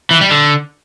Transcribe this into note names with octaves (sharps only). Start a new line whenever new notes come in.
E3
G3
D3